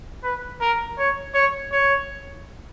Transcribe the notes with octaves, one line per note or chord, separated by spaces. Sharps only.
B4
A#4
C#5
C#5
C#5